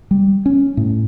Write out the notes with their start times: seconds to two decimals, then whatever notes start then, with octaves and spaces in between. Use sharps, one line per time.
0.11 G3
0.46 C#4
0.77 A2